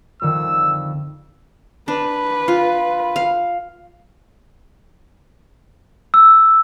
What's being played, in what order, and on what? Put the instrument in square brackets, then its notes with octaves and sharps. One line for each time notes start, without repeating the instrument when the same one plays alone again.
[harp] F2 D3 D#3 [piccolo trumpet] E6
[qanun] D4 [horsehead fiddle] B4
[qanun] F4
F5
[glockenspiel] E6